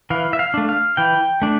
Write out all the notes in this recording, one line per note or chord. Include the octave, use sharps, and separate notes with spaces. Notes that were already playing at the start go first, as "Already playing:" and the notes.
E3 F5
E5
F5
A3 D4
F5
E3 G5
A3 D4